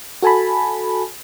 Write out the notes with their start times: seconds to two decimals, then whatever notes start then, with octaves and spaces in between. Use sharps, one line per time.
0.22 F#4 A4 G#5 A5 B5